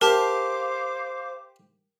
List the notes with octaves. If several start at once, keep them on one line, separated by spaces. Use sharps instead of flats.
G4 A#4 C5 F5 A5 D6